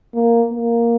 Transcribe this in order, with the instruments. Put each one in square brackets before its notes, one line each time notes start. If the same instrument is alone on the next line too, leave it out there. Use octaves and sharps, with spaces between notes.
[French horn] A#3
A#3